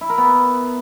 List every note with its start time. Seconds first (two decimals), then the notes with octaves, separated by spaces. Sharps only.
0.01 E4
0.09 A#4
0.18 B3